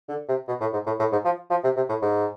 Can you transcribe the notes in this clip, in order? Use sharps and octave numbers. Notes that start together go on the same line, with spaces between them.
D3
C3
B2
A2
G#2
A2
A2
G#2
F3
F3
C3
C3
A2
G#2